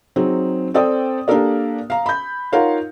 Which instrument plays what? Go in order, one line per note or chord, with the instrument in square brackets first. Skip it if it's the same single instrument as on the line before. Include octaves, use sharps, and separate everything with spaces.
[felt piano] F#3 C4 D#4 G#4
C4 A4 D5 G5 D#6
A#3 D4 G4 A4 A#4 D5
F5 A#5
B5 G6
D#4 F4 A#4 C#5 F5 F#5